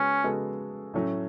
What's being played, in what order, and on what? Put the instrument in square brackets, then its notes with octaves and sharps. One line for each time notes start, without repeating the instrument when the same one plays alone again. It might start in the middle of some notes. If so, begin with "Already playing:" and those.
Already playing: [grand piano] C#3 G#3 B3 F#4 [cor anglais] C#4
[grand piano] C#3 G#3 B3 F#4 A4
A2 F#3 A3 C#4